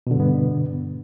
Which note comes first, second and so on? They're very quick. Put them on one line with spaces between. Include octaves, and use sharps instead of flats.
B2 D3 G2 B3